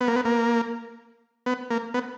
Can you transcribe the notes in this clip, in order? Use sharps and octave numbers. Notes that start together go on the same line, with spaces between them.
B3
A#3
B3
A#3
B3
A#3
B3